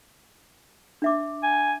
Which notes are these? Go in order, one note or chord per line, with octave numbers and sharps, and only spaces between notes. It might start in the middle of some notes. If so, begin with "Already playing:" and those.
D4 E5 D6
G#5